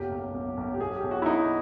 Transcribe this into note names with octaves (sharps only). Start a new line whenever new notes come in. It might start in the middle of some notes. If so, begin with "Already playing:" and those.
Already playing: F#1 B1 G4
B1
B1
B1
G4
B1 G#4
G4
B1
F#4
E4
B1 D#4